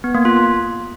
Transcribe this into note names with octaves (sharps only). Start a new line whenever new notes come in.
B3
A#3
F4